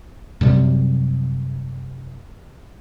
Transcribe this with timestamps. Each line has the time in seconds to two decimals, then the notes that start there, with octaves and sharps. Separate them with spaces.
0.41 F#2 C3 G3